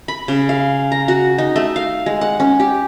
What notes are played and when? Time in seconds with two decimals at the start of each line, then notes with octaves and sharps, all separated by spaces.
0.08 B5
0.28 C#3
0.49 F5
0.92 A#5
1.08 F#4
1.38 D#4
1.56 A3
1.76 F5
2.06 G#3
2.21 F#5
2.40 C#4
2.60 G4